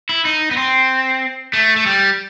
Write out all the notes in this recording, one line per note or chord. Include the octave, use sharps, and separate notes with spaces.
E4
D#4
B3
C4
A3
A3
G3